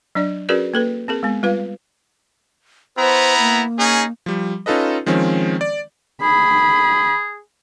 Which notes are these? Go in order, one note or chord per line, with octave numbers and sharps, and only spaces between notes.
F#3 D4 D5
C#4 F#4 G#4 A#4 B4 D5
A#3 A4 B4
C4 G#4 A#4
G#3 B3
G3 F4 B4 F5
B3 E4 C5 A#5
A#3
C#4 D#4 G#4
F3 G3
C#4 D#4 F4 A4 B4 D#5
D#3 F3 G#3 C4 C#4
D5
G#4 B5